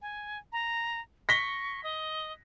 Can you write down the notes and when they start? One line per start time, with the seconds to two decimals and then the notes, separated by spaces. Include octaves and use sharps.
0.02 G#5
0.52 A#5
1.29 C#6 A#6 B6 G7
1.84 D#5